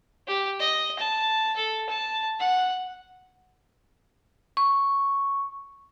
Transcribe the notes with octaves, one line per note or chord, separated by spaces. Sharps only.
G4
D#5
A5
A4
A5
F#5
C#6